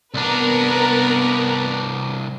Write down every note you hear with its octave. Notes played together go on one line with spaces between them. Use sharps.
C2 B3 D4 A#4 B4